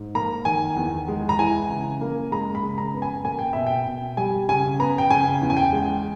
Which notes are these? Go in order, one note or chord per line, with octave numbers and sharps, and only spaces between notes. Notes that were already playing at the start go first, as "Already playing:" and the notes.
Already playing: G#2
A#3 A#5
D#3 G#5
E2
G#3
A#5
E3 G#5
C#3
A#3
G#3 A#5
B5
C#3
A#5
B3
G#5
A#3 G#5
G5
B2 E5
G5
B2
G3 G#5
C#3 G#5
B3 A#5
G5
C#3 G#5
E2
G#5
G5
G#3